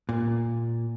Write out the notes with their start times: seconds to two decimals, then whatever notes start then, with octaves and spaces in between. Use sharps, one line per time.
0.09 A#2